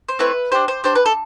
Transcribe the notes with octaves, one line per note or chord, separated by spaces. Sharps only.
C5
A3 C4 E4 B4
D4 G4 C5
C5
D4 G4 C5
B4
A4